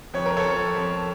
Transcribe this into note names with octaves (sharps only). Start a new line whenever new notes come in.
F2 C#5
A#4
A4 C#5
F2
F2